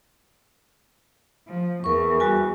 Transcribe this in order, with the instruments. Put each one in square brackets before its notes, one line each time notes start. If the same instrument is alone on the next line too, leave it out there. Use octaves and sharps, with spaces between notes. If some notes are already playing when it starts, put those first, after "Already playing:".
[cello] F3
[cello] E2 [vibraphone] A#4 C#6
[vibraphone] G3 F#4 G#5